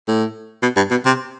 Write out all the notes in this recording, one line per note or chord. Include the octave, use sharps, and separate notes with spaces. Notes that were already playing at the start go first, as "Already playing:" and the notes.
A2
B2
G2
B2
C3